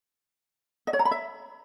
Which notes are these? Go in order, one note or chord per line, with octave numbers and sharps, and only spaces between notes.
D#5
C#5
A#5
B5
E5